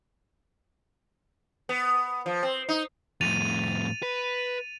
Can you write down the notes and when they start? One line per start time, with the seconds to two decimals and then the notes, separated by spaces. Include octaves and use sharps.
1.69 B3
2.26 F3
2.43 C4
2.69 D#4
3.21 F2 A2 A6 D#7 F7
4.03 B4